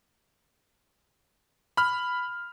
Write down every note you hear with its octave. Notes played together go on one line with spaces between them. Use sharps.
B5 F6